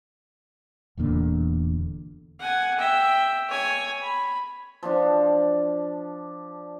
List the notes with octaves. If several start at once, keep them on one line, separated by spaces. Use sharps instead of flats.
E1 E2 A#2 D3
F#5 G#5
E5 G5
C#5 G#5
B5
F3 D4